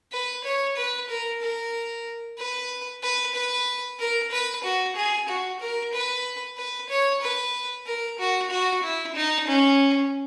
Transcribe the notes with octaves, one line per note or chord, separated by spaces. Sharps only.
B4
C#5
B4
A#4
A#4
B4
B4
B4
A#4
B4
F#4
G#4
F#4
A#4
B4
B4
C#5
B4
A#4
F#4
F#4
E4
D#4
C#4